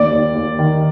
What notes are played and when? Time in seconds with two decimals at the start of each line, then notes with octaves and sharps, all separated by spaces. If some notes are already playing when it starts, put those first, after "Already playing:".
Already playing: D#2 D5
0.12 D#2
0.35 D#2
0.59 D#3